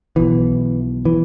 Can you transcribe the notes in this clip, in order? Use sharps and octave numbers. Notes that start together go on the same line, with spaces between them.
B1 B2 E3
E3